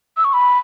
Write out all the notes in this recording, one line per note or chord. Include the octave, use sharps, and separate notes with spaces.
E6
C#6
B5